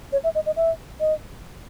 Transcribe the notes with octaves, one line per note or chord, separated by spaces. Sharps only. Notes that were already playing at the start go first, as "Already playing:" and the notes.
C#5
E5
D#5
D#5
E5
D#5